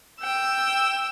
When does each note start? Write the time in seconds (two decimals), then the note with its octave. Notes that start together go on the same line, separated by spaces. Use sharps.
0.21 G5 E6